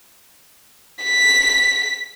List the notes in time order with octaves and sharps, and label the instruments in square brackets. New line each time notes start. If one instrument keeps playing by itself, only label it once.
[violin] B6